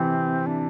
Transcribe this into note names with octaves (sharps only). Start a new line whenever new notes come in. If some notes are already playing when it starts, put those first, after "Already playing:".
Already playing: C3 E3 C4
D4